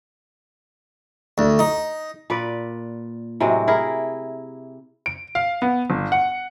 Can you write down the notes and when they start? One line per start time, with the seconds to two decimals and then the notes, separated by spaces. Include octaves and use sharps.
1.38 D2
1.59 D#4
2.30 A#2 B4 D5
3.40 A2 C3 F#3 G#3
3.68 E4 G#4 A#4
5.06 D7
5.35 F5
5.62 B3
5.90 G1
6.12 F#5